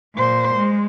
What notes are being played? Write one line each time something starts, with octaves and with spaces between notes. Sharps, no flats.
A#2 C5
G#3